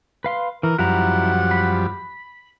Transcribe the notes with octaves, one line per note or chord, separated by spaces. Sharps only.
B4 F5 C6
E3 A#4
F#2 F3 G3 E4 F#5 A#5
B5